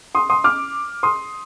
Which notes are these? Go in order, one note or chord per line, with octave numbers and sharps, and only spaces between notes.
C6 D#6
C6 D#6
D6 F6
C6 D#6